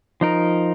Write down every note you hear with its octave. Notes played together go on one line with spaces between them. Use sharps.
F3 D#4 A#4